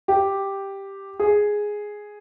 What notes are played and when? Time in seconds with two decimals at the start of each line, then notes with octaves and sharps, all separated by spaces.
0.08 G4
1.19 G#4